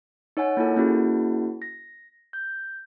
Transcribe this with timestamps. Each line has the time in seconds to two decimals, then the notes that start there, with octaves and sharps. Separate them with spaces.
0.37 D#4 C#5 F#5 G#5
0.57 A#3 E4 F4 A4
0.76 A#3 C#4 E4 F#4 G#4
1.62 A#6
2.33 G6